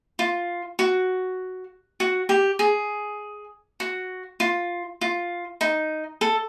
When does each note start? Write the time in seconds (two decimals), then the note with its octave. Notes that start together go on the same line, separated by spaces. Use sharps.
0.19 F4
0.79 F#4
2.00 F#4
2.29 G4
2.59 G#4
3.80 F#4
4.40 F4
5.01 F4
5.61 D#4
6.21 A4